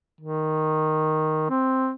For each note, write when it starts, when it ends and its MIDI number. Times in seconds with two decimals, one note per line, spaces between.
0.21 1.49 51
1.50 1.92 60